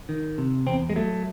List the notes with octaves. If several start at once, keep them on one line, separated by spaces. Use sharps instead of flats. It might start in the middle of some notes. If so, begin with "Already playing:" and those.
D#3
C3
E2 C4
G#3
F#3 A3